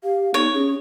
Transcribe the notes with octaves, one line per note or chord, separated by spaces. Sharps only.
G4 F5
B3 D#4 C#5
C#4 G#4